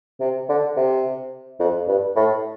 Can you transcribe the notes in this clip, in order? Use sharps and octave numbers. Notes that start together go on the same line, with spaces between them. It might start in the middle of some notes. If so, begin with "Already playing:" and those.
C3
D3
C3
F2
G2
A2